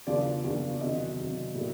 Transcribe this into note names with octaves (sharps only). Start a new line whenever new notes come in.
E2 C#3 F3 A#3 D4 D5
E2 C#3 F3 A#3 D4
E2 C3 D#3 F#3 D#5
E2 C3 D#3 F#3
A2 F#3 A#3 D4